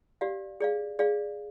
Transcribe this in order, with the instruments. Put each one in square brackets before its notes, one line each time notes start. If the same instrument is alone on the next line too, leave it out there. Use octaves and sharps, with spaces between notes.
[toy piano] G4 D5 F5
G#4 D5 F5
G#4 D5 F5